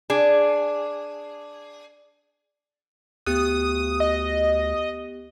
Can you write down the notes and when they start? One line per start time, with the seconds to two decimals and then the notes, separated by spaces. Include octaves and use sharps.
0.10 D4 G#4
3.27 D2 B3 G4 D#6 F#6
4.00 D#5